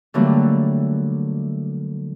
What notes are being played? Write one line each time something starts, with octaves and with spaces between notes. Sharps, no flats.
D3 E3 F#3 G3 A3 A#3